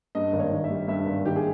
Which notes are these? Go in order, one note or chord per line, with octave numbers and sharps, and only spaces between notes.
G2 D#5
G#1
C#5
D#3
E5
G3
G2 E5
G#1
D#3 G4
G#4